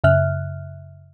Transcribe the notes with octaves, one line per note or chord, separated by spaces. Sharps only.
F#2 C#3 E5 F6 F#6